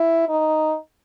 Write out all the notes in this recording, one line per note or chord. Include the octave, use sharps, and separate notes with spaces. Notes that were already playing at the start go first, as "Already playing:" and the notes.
Already playing: E4
D#4